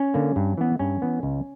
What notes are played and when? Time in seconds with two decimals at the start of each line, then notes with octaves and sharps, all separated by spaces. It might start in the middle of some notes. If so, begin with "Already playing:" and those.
Already playing: C#4
0.14 D3 A#3
0.36 G2
0.58 E3 B3
0.79 G2 C#4
1.02 E3 B3
1.23 C#2